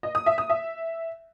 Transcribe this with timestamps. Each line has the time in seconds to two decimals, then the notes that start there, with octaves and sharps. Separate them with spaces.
0.03 D#5
0.15 D#6
0.26 E5
0.38 D#6
0.50 E5